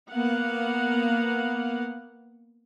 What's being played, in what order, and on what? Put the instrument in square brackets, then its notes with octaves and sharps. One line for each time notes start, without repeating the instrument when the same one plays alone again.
[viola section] A#3 B3 F5 F#5